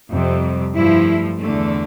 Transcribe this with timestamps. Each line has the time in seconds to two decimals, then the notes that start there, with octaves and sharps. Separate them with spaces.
0.10 F2 C3 G3
0.74 G2 F3 A3 E4
1.39 E2 D3 A3